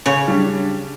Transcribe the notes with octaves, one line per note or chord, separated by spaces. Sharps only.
C#3 C#5
G3 D4